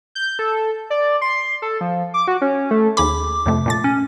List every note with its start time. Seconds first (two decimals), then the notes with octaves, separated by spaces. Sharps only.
0.15 G6
0.39 A4
0.90 D5
1.22 C6
1.62 A4
1.81 F3
2.14 D6
2.28 F#4
2.41 C#4
2.71 A3
2.97 D#2 G#4 B5 D6
3.46 F2 C3 A3
3.66 A#2 A3 A6
3.84 C#4